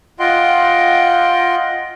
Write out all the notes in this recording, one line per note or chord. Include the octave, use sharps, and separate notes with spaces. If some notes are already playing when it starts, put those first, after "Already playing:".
F4 D#5 F#5 G5 C6